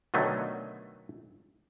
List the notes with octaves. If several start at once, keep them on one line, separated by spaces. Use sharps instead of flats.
B2 D3 D#3 F#3 A3